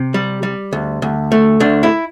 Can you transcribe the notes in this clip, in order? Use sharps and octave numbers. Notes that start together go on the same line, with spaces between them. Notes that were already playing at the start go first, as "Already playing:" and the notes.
Already playing: C3
G3
G3
D2
D2
A3
D2 D4
E4